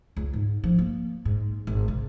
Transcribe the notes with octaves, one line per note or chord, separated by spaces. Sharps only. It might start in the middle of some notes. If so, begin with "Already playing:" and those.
C#2
G#2
F3
A#3
G#2
G#1
C3